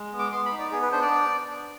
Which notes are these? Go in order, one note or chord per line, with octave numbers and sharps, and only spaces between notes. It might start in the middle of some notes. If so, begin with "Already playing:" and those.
Already playing: G#3
B3
D6
B3 C6
B5
D#4
D5
B3 G#4
B4
D4 C5
D5